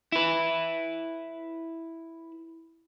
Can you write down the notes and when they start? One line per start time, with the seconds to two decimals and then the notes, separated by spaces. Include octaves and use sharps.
0.12 E4 B4